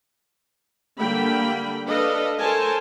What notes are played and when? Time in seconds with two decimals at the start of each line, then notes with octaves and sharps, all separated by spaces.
0.99 D3 G3 A#3 G5 B5
1.87 D4 A4 B4 D#5 F5
2.39 A4 A#4 C5 C#5 G#5 A5